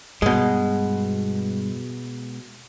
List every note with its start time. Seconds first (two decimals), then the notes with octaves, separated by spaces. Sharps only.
0.22 G2 B2 G#3